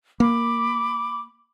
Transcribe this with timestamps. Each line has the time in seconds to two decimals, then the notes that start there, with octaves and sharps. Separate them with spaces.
0.20 A#3 B5 D6